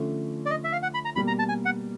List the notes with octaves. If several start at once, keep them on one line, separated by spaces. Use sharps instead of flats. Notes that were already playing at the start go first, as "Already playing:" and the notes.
Already playing: D3 F3 A3 C#4
D5
D#5
E5
F5
F#5
B5
A#5
B2 G3 A#3 B5
A#5
A5
G#5
F#5